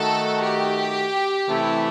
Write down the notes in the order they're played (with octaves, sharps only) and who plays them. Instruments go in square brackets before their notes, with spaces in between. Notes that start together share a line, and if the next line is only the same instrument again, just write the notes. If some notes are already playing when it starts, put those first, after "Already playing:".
Already playing: [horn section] D#3 A3 D#4 F#4 [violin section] A4
[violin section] G4
[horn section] C3 E3 A3 E4